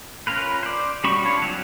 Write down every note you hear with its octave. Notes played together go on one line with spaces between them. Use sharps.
C#4 F4 A#4 B4
C5 D5
G3 C#4 F#4 B5 C#6
D4 F4 C#5
F#3 C4 C#4